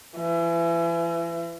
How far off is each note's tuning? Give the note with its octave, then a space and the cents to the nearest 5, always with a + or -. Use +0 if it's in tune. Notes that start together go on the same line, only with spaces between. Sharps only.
E3 +35